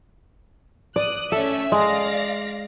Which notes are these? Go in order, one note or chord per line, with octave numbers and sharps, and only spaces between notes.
D5 D#6 F#6
A3 C#4 A4 E5
G#3 D5 F5 A#6